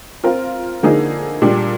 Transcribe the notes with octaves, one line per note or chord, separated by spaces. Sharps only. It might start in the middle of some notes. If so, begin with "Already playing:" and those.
C4 F4 A#4
D3 F3 A#3 D#4 G#4
A#2 G3 D4